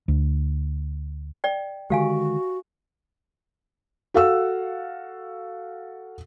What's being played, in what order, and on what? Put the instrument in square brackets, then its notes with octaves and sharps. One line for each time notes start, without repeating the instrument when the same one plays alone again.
[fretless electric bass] D2
[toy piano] D5 G5
[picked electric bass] D3 D#3 G#3 [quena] F#4 [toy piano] G4 F5 G#5
[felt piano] F#4 A4 F5 F#5 E6